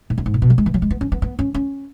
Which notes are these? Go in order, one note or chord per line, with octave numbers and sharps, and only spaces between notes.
G#2
F#2
G#2
A#2
B2
F#3
G#3
E3
F#3
G#3
B3
C#4
B3
B3
C#4
C#4